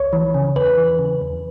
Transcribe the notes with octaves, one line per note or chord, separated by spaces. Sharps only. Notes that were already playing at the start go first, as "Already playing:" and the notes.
Already playing: C#2 C#5
E3
C#3
E2 B4
E3
C#3
E2